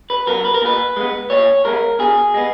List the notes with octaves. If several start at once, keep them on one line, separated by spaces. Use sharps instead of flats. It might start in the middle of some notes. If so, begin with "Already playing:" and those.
B4
F#3 B3 A#4
B4
A#4
A#2 B4
G#3 B3
A#2 C#5
G#3 B3 A#4
B2 G#4
G#3 B3